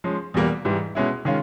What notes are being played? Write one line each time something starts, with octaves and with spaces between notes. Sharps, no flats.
F3 G#3 C#4
E2 B2 G3 A#3
G#2 E3 G3
B2 G#3 C#4 E4
D#3 G#3 C#4 F4